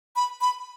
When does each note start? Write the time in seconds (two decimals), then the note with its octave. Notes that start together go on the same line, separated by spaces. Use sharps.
0.16 B5
0.41 B5